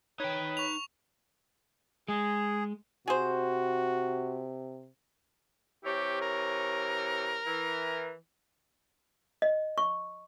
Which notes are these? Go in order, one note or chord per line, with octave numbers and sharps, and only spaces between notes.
D#4 B4 C#5 G5
C#6 F7
G#3 G#4
C3 F#4 G#4 C5
C3 E3 G4 C#5
A#4
E3
D#5
C#6